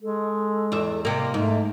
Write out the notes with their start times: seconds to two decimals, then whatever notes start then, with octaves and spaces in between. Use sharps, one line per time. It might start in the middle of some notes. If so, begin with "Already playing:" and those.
0.01 G#3 A4
0.72 E2 E5
1.05 C3 A#3 D#5
1.34 G#2 A3